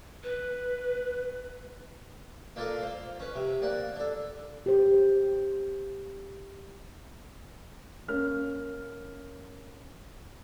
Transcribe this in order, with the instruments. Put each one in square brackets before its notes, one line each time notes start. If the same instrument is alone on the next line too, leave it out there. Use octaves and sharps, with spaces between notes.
[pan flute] B4
[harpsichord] A#3 D4 F4 A4 A#4 D5
C5 F5
C#4 B4
C3
A#3 D5 F#5
D4 A4
[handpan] G4 C5
[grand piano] A#3 C#4 F6